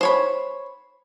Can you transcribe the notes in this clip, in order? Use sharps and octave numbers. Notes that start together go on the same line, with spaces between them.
C5 C#5 B5